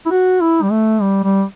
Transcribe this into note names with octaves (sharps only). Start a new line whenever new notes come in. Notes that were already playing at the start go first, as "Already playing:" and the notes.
E4
F#4
E4
G3
A3
G3
G3